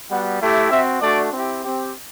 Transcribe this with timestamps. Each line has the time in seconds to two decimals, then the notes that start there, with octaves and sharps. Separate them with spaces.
0.10 G3 B3 F#4 F#5
0.41 A3 E4 G4
0.71 C4 F#4 E5
1.01 A3 D4 F#4 D5
1.31 C4 E4 G4
1.62 C4 G4